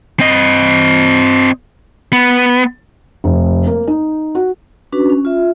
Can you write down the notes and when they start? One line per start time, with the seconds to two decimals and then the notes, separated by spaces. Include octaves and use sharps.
0.20 C4 D#5
2.13 B3
3.24 F1
3.66 A#3
3.87 D#4
4.35 F#4
4.92 C#4 D4 F#4 B4
5.10 C#4
5.25 F4 E5